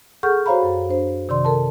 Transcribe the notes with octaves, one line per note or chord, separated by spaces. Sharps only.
G#4 A4 F#5 C#6 F6 G6
F#4 C5 C#5 F5 A#5 B5
F#2
D4 C5
C3 D#3 D5 C6
A4 A#4 A5